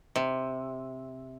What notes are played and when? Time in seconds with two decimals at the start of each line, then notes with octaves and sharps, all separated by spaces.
0.16 C3